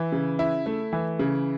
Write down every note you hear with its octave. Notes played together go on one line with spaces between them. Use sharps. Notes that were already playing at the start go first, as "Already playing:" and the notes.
Already playing: E3
C#3
E4
A3
E3
C#3